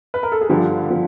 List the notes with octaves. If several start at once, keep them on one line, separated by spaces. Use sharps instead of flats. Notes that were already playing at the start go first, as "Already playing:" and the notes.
B4
A#4
A4
G#4
G2 D3 F3 G4
F3